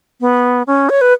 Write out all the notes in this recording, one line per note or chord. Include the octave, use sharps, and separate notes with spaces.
B3
C#4
C#5
B4